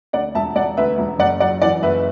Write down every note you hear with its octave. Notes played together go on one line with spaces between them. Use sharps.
D2 D5 F#5
E1 E5 A5
E1 D5 F#5
D2 B4 E5
E1
F#1 D5 F#5
F#3 D5 F#5
E3 D5 F#5
F#1 B4 E5